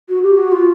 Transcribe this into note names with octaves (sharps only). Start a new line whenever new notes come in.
F#4
G4
F#4
F4